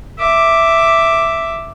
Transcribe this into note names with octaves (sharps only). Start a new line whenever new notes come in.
E5 D6